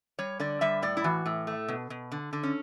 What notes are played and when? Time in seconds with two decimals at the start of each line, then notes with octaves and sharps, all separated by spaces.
0.19 G3 C#5
0.40 D3 D5
0.61 G3 E5
0.82 A2 D5
0.97 E4
1.04 E3 F#4
1.26 A2
1.47 A3
1.68 B2
1.90 B2
2.12 D3
2.33 D3
2.43 C#4